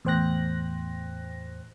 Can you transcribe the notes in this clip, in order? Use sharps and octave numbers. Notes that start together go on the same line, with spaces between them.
E2 A2 C5 G5 F#6 A#6